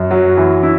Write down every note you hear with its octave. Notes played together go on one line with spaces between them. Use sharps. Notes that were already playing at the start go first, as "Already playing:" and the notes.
Already playing: F#2
F#3
E3
E4